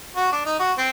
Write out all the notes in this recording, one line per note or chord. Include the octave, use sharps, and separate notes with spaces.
F#4
D4
D#4
F#4
C4